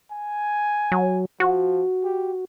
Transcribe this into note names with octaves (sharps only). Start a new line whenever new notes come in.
G#5
F#3
F3 F#4
G4